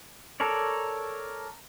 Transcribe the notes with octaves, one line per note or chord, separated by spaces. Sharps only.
A4 A#4 C#5 D5